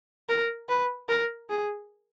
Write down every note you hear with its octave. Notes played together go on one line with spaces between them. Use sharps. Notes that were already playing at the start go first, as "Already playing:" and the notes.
A#4
B4
A#4
G#4